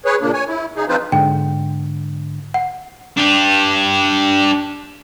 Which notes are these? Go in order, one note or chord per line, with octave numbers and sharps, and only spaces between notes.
G#4 B4 C#5
A#2 C#3 A#3 D4
C#5 G#5
E4
C#3 D#4 G#4
F3 C4 D#4 F4 B4 C5
G#2 D3 G5
F#5
D4 G4